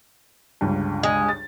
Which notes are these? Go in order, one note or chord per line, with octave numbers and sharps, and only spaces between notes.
G1 C#2 G2
G#3
A6